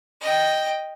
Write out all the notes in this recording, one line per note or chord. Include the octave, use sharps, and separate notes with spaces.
D#5 G5